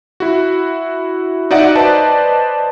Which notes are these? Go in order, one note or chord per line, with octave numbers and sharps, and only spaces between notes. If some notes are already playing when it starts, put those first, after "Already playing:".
E4 F#4
D#4 F#4 D5 E5 F#5
B4 C5 D5 D#5 A5